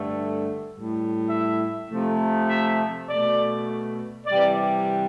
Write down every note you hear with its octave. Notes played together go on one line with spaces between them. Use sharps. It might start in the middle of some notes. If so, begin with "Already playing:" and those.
Already playing: G2 D3 A3
A2 G3
E5
C3 F3 A3
E5
B2 A3 D5
C3 E3 G3 D5